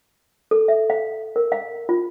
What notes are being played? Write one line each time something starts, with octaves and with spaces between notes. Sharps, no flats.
A4
E5
F5
A#4
F5
F4